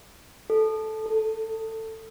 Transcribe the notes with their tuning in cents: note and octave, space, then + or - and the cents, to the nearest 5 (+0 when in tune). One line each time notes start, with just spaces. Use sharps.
A4 -10
A4 +20